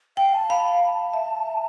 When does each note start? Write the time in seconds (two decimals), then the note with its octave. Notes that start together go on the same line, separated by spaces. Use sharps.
0.17 F5 G5
0.34 A5
0.50 F5 B5
0.82 A5
1.14 E5